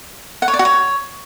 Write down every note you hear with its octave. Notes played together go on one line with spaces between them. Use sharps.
F#5
C#5
D5
F#4
C#5